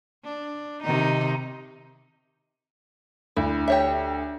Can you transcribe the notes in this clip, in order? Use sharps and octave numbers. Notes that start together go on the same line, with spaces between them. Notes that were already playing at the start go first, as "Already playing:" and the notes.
D4
C3 D#3 D#4
D2 E4
G4 C#5 E5